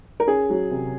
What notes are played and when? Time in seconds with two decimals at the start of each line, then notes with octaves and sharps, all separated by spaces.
0.20 A#4
0.27 C#4 G#4
0.50 F#3
0.71 C3